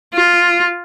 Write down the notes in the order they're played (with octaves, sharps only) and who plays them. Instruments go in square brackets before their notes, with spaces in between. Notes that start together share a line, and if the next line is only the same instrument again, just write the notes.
[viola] F4